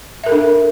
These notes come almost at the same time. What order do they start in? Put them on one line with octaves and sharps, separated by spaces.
E5 A#4 A4 D4